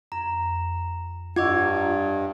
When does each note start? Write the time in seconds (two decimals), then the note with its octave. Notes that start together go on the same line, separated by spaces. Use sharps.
0.12 F2 A#5
1.36 G2 F4 D#5 F#5 C#6 D6 E6 G#6
1.64 A#5